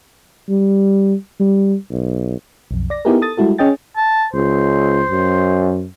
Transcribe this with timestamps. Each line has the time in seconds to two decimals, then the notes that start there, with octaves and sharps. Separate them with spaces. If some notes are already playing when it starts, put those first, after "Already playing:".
0.49 G3
1.40 G3
1.90 B1
2.71 B1 F2
2.90 D5 A#6
3.05 B3 D#4 E4 G4 G#4 A#4
3.21 A4 D#6 A6
3.37 G3 G#3 E4 F#4 A4
3.58 C#4 G#4 D#5 G5 A6
3.97 A5
4.34 C#2 C5
5.09 F#2